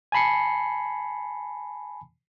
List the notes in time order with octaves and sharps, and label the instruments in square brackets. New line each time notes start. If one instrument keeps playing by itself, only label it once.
[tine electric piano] G#5 A5 B5 C7 C#7